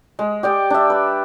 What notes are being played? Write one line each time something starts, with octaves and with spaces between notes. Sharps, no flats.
G#3
G4 D5 G5
D4 E5
B4